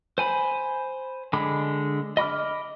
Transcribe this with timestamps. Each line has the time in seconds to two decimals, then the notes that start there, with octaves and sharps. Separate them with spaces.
0.18 C5 G#5 B5
1.33 D3 G#3 B5 D6
2.17 D#5 B5 D6 F6